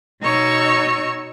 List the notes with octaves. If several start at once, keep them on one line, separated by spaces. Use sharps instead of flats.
B2 D#4 C#5 C#6 E6